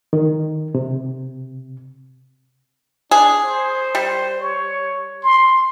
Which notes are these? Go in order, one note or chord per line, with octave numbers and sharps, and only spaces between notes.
D#3
C3
D4 G#4
C5
G3
C#5
C6